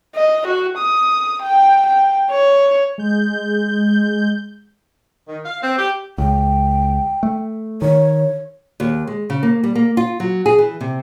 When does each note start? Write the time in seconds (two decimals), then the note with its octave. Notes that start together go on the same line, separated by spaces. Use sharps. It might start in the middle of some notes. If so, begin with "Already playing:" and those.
0.15 D#5
0.48 F#4
0.78 D#6
1.43 G5
1.87 G5
2.31 C#5
2.98 G#3 G6
5.28 D#3
5.46 F5
5.63 C4
5.79 G4
6.18 C#2 G5
7.23 A3
7.82 D#3 C#5
8.80 D#2
9.07 G#3
9.30 C#3
9.43 A#3
9.63 G3
9.75 A#3
9.97 F4
10.20 F#3
10.46 G#4
10.58 E3
10.81 C3